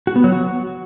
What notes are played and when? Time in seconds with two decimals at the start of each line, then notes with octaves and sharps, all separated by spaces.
0.07 F#4
0.16 B3
0.24 F#3
0.32 F#4